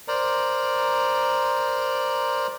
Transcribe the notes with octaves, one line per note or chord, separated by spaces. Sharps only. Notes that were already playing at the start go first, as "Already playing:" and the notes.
A#4 C5 D5 A#5